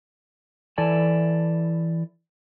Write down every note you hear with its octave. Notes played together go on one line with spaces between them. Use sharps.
E3 E4 A4 D5 G#5 A5